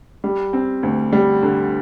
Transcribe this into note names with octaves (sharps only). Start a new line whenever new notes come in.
G3
C4
D2
G3
D3